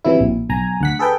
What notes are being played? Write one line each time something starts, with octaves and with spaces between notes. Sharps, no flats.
C3 E3 F#3 E4
A#1
B1 G#5 A#5
D2 F#5 B6
G#4 A4 B4 G5